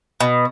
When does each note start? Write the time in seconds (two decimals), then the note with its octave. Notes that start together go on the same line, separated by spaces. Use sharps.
0.20 B2